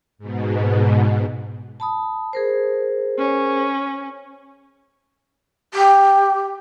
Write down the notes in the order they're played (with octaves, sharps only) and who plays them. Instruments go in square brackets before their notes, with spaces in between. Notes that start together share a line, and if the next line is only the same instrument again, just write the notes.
[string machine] G#2 B2
[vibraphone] A5 B5 D#6
G#4 A#4 C5
[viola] C#4
[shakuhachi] G4